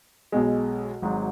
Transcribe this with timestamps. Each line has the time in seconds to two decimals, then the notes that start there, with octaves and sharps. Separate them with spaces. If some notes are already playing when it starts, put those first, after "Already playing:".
0.32 B1 B2 G#3
1.02 G#1 G#2 F#3